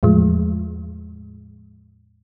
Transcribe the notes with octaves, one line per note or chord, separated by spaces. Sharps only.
E2 A2 F3 G#3